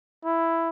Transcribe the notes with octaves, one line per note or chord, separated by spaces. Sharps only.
E4